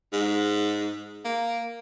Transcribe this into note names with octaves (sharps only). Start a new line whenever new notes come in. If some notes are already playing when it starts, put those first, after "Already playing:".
G#2
A#3